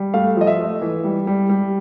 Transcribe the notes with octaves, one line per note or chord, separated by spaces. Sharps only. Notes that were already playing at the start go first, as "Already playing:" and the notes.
Already playing: G3
A3 F5
F3 D#5
E5
A3
E3
G3
G3
G3